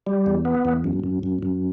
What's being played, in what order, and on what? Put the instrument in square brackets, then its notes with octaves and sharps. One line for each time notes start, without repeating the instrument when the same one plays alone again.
[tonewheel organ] G3
E2
B3
E2
F#2
F#2
F#2
F#2